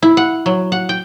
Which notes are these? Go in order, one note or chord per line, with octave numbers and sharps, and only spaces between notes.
E4
F#5
F#3
F#5
G5